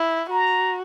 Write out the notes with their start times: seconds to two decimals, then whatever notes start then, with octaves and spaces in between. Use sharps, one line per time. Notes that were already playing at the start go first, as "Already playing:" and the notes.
Already playing: E4
0.30 F#4 A#5